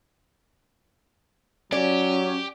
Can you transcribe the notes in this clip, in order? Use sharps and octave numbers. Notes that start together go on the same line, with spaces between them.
F#3 C#4 G4 D5